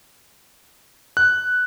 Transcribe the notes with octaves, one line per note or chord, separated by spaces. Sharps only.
F#6